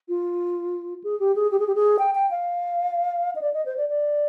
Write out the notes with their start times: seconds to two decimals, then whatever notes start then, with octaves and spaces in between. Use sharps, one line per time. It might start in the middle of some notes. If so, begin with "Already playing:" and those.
0.09 F4
1.04 G#4
1.20 G4
1.36 G#4
1.51 G4
1.60 G#4
1.67 G4
1.75 G#4
1.99 G5
2.15 G5
2.31 F5
3.36 D#5
3.41 D5
3.54 D#5
3.65 C5
3.77 D5
3.89 D5